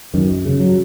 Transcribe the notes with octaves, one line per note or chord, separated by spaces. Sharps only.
F#2 D#3
C#3
F#3